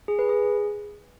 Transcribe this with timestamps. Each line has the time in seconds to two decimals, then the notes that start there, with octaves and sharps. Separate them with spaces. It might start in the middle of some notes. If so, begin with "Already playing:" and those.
0.08 G#4
0.19 B4
0.29 G#4